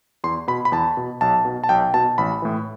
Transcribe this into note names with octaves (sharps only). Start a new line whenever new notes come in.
E2 C6
B2 B5
B5
E2 A5
B2
B1 A5
B2
A5
B1 G5
B2 A5
A1 B5
A2 E3